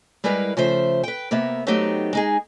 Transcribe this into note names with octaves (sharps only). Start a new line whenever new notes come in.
G3 G#3 E4 A#4 B4 F5
C#3 F3 A3 C5 E5
B4 G5
C3 A#3 B3 A#4 E5
F#3 A3 B3 C4 D#4 G4
G#3 D#4 G#4